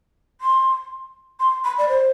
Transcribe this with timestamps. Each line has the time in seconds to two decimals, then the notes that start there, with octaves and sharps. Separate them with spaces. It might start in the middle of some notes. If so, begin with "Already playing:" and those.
0.41 C6
1.40 C6
1.64 B5
1.78 D5
1.89 C5